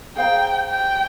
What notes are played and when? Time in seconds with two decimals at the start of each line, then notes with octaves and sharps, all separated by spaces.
0.16 G#4 C5 F5 G5 A#5
0.70 G5